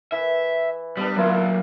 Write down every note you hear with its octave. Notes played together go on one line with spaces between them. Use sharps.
E3 E5
G3 B3 D4
F#3 A3 A#3 E4 F4